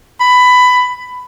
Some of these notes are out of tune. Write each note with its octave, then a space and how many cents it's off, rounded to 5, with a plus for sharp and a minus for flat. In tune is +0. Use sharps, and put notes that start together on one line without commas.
B5 +15